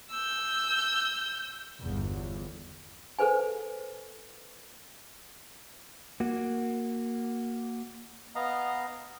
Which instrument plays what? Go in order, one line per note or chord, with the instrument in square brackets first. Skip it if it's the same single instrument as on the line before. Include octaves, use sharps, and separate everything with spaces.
[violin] E6 G6
[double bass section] G1 E2
[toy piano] A4 B4 C5 G#5
[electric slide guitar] A#3 F#4
[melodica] B3 D#5 F5 A#5